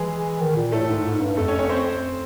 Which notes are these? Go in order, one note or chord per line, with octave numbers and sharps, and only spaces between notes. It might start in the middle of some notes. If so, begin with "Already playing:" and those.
Already playing: E3 G#3 G#4
D#3
A#2
A2 A3 A4
G#2
G#2
G2
F2 A3 A4
C#4 C#5
C#4 C#5
C4 C5